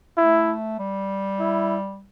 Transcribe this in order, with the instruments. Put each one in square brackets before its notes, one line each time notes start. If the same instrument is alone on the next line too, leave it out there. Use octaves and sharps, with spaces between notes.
[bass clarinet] A3 [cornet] E4
[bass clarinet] G3
[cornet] E4